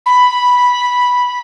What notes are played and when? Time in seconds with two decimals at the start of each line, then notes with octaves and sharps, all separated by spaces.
0.06 B5